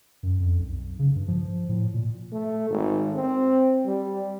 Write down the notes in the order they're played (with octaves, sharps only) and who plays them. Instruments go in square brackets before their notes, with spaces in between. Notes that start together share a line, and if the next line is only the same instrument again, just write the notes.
[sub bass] F#2
F2
B1
C#3
G2
F3
A2
A#2
[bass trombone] A3
G#1
C4
G3